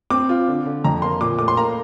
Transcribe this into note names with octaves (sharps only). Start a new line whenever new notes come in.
C4 D6
F4
D3
D3
F2 A#5
A#3 C6
A#2 D6
A3 D6
C6
A#3 A#5